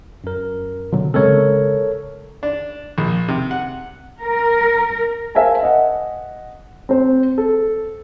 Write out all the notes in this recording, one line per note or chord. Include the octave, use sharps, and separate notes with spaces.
F#2 A#4
B2 D3 F#3
C#3 G#3 C4 A4 A#4 C#5
D4
A#1
C3
F#5
A#4
A#4 C5 E5 F5 G#5 A5
D#5 F#5
C4 C5
A4